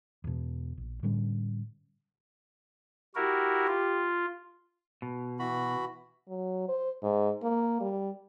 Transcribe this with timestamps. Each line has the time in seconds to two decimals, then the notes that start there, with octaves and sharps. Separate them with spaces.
0.24 E2 B2
0.77 A#1
1.03 A2 D3 G3 C#4
3.15 E4 F#4 G4 A#4
3.68 F4
5.02 B2
5.39 E3 F#4 B5
6.28 F#3
6.69 C5
7.03 G#2
7.42 A#3
7.81 G3